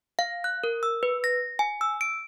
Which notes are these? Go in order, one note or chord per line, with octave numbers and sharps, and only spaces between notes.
F5
F#6
A#4
E6
B4
A#6
G#5
E6
D7